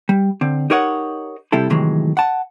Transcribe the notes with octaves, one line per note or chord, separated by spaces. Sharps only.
G3
D3 C4
D#4 G4 A#4 C#5 D#5 F#5
C3 G3 E4 A4
A2 C3 D#3 E3 F#3 G#3
F#5 A5